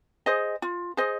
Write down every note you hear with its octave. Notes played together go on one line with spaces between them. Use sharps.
G#4 C5 D#5
F4
G#4 C5 D#5